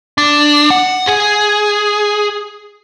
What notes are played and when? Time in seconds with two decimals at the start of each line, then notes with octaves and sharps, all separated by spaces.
0.18 D4
0.70 F#5
1.07 G#4